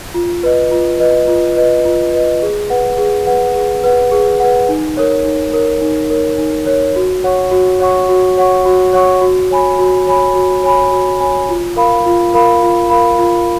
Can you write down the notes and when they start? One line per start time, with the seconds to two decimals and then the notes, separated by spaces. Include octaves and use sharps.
0.14 F4
0.43 B4 D#5
0.71 F4
1.00 B4 D#5
1.28 F4
1.57 B4 D#5
1.85 F4
2.13 B4 D#5
2.42 G#4
2.70 B4 F#5
2.98 G#4
3.27 B4 F#5
3.55 G#4
3.84 B4 F#5
4.11 G#4
4.40 B4 F#5
4.69 D#4
4.97 A#4 C#5
5.25 D#4
5.53 A#4 C#5
5.82 D#4
6.10 A#4 C#5
6.38 D#4
6.66 A#4 C#5
6.96 F#4
7.24 C#5 F#5 C#6
7.51 F#4
7.80 C#5 F#5 C#6
8.09 F#4
8.37 C#5 F#5 C#6
8.66 F#4
8.93 C#5 F#5 C#6
9.21 F#4
9.51 C#5 G#5 B5
9.79 F#4
10.07 C#5 G#5 B5
10.35 F#4
10.63 C#5 G#5 B5
10.92 F#4
11.21 C#5 G#5 B5
11.49 F4
11.76 A#4 F5 B5
12.06 F4
12.34 A#4 F5 B5
12.63 F4
12.90 A#4 F5 B5
13.19 F4